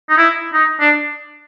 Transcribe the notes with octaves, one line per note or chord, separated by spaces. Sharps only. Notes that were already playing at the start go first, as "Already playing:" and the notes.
D#4
E4
D#4
D4